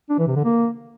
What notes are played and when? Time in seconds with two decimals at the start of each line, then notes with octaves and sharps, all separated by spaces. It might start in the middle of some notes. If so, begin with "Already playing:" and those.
0.10 D4
0.18 E3
0.27 C3
0.36 D3
0.45 A#3